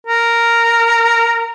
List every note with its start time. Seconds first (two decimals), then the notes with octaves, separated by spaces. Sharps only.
0.07 A#4